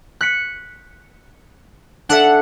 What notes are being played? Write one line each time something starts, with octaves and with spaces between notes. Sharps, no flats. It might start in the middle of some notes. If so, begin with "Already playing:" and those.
F#6 B6 C#7
D4 A4 E5 F#5